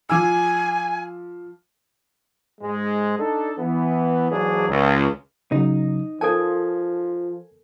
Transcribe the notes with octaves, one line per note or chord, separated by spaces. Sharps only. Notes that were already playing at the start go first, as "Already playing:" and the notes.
F3 G#5 D6 E6
G#2 G#3
D4 D#4 A4
E3 B3
G#2 E3 F#3 A#3 D4 G#4
C#2
C#3 F#3 D#4
F3 A4 A#4 G#5 A5 G#6